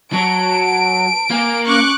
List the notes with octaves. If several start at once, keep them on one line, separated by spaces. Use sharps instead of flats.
F#3 A5 D7
A#3 G#5
C#4 C#6 D6 F#6